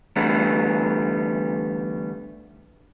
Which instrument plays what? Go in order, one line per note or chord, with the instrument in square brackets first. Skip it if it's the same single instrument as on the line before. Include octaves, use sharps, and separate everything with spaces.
[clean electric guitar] D3 E3 G3 A3 B3